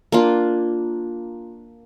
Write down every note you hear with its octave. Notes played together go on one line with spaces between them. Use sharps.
A#3 D4 F4